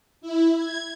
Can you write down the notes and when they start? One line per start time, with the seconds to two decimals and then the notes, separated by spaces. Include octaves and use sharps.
0.21 E4
0.57 G#6